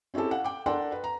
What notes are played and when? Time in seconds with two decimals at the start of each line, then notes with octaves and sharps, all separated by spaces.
0.14 C4 C#4 E4 G4 A4
0.31 F5 F#5
0.44 G5 D6
0.66 D4 A4 A#4 F#5 G5 C6
0.92 B4
1.04 A#5